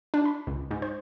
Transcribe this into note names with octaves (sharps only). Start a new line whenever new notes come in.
D4
B5
C#2
G#2
C5